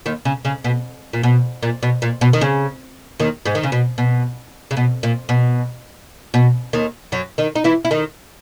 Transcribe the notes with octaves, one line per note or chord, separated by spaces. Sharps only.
D#2 D#3
C#3
C#3
B2
A#2
B2
A#2
B2
A#2
B2
D#3
C#3
D#2 D#3
G#2 G#3
D#3
C#3
B2
B2
C#3
B2
A#2
B2
B2
D#2 D#3
F#2 F#3
D#3 D#4
D#4
E3 E4
E4
D#3 D#4